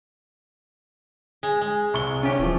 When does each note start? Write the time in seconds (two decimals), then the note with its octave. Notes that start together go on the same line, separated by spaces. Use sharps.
1.43 G#3
1.61 G#3
1.94 C2 C#6 G7
2.23 C#4 F4 G4
2.39 D#1 E3 F3